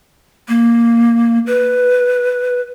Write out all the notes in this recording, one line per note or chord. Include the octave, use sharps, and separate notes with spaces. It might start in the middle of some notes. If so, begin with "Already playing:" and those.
A#3
B4